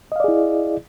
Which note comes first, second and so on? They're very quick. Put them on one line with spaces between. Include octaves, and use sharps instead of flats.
D#5 F5 D5 G#4 E4